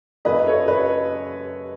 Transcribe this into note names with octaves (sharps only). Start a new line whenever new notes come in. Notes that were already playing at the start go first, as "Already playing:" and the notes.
F#2 C#3 F#3 B4 D#5
A4 C#5
B4 D#5